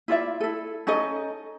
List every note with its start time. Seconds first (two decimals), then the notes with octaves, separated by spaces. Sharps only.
0.08 E4 F4 D5 E5
0.40 E4 A4
0.87 C#4 D#4 A4 D#5